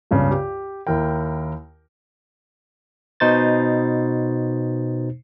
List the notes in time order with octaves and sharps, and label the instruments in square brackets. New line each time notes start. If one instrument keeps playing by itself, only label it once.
[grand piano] C#2 G2 C#3 B3
G4
D#2 E4 A#4 G5
[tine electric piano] B2 D#4 C5 A6